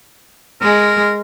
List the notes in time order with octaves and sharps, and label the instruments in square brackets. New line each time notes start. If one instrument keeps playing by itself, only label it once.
[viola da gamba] G#3 [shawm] A#4